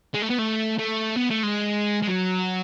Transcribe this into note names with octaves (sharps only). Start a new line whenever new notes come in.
G#3
A3
B3
A3
A3
B3
A3
G#3
G#3
F#3